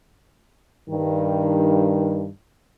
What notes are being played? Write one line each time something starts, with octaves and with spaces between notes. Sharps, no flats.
G2 D#3